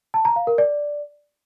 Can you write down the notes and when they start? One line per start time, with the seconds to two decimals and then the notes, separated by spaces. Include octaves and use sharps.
0.14 A5
0.25 A#5
0.36 F5
0.47 A#4
0.58 D5